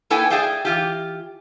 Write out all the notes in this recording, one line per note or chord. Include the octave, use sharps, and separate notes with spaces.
A#3 E4 A4 B4 G5 G#5
G#4 D5 E5 F5 G5
E3 F4 G4